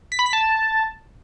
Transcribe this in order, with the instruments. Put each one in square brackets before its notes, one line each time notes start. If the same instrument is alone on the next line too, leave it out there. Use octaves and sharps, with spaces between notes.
[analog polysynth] B6
B5
B6
A5